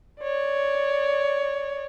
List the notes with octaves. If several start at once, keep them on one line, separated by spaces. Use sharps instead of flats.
C#5 D5